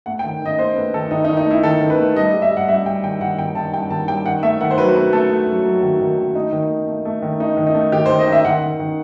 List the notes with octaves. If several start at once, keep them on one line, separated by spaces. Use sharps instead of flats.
A3 F#5
G5
D#3
D#3 D#5
A3 C5
A3 B4
D#3 A4
D#3 D#4
D#4
D#3
D#4
A3 E4
D#3 A4
D#3
B4
A3
G3 D#5
G3
E5
G3
F#5
G3 E5
G3 G5
D#3 G5
D#3 F#5
D#3 G5
D#3 A5
G3 G5
D#3 A5
G3 G5
D#3 F#5
A3 E5
D#3 F#5
C5
F#3 B4
A3 B4
A3 A4
A3
F#3
F#3
D#3
D#3
D#3
A3 D#4
D#3
A3
A3
A3
D#3
A3 D#4
D#3
D#4
A3
D#3 G4
C5
D#3
D#5
D#3 E5
D#3 F#5
D#3
D#3